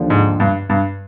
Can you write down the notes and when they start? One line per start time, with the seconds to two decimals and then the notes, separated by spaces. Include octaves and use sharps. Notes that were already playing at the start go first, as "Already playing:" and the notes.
Already playing: D#2 D3 F3
0.10 G#2
0.40 G2
0.69 G2